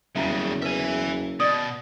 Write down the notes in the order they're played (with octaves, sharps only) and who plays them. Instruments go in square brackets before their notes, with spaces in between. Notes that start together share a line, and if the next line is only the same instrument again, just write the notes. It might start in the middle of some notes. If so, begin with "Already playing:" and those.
[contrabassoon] F#1 [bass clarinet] E2 [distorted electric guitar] G2 C#3 [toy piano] E5 A#5
[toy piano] B4 [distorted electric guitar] E5 G#5
[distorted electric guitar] B2 [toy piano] D5 D#6